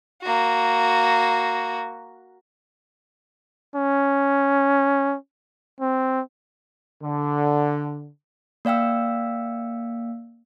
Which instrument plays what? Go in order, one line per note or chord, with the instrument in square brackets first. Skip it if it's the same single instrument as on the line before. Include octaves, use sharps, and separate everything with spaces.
[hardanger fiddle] A#3 F#4
[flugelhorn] C#4
C4
[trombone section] D3
[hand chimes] A#3 D5 F5 G5 E6